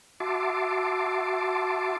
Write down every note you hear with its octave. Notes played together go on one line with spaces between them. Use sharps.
F#4 E5 A5 C6 D6